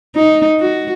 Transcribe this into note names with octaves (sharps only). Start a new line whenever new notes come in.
D#4
F#4